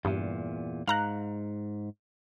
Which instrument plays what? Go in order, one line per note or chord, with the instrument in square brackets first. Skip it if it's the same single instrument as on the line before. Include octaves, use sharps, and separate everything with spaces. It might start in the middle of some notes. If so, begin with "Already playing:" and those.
[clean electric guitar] E2 A#2 [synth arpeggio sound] G2
[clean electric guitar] G#2 [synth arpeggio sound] F5 A#5 F#6